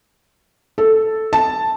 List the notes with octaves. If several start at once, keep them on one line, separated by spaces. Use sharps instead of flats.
A4
A5